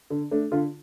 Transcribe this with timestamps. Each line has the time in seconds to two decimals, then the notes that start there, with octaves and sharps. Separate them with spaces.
0.10 D3
0.31 A3 D4
0.52 D3 F4